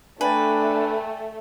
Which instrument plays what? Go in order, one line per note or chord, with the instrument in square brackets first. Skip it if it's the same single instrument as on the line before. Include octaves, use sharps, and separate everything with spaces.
[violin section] A3 [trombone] D4 [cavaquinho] B4 [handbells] D5 G5 G#5